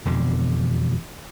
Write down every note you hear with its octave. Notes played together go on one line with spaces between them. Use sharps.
E1 F2 B2 D3